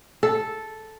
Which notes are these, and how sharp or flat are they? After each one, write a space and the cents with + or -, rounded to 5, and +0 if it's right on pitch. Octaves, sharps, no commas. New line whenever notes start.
A4 -5